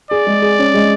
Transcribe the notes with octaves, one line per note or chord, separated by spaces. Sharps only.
G#4 D5
G#3
G#4
C#4
G#3